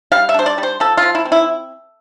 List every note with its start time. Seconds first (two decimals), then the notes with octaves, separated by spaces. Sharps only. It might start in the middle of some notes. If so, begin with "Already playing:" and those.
0.12 G3 F5
0.29 E5
0.34 D4 C5
0.46 D5
0.58 G3
0.63 C5
0.80 F3 A4
0.97 F3 F4
1.15 E4
1.25 C4
1.32 E4